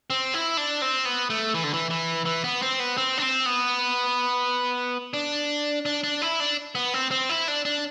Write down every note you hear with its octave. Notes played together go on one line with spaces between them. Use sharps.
C4
E4
D4
C4
B3
A3
E3
D3
E3
E3
E3
B3
C4
B3
C4
D4
C4
B3
D4
D4
D4
E4
D4
B3
C4
C4
E4
D4
D4